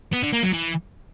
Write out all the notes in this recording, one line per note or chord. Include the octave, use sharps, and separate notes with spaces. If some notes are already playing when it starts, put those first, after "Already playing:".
B3
D3
A#3
F#3
E3